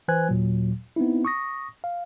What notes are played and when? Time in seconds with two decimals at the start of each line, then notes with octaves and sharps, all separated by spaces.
0.08 E3 B4 C5 G#5 F#6 G#6
0.29 D#2 A#2 F#3
0.96 B3 C4 D#4 E4
1.25 C#6 D#6 A#6
1.84 F5